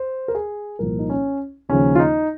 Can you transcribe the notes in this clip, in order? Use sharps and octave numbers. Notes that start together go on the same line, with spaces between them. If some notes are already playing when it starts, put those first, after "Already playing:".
Already playing: C5
A#4
G#4
C2 A#2 F3 A#4
D#4
C#4
D#2 C#3 F3 C#4
F4
D#4